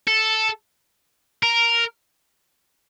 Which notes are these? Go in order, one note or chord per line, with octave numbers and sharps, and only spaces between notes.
A4
A#4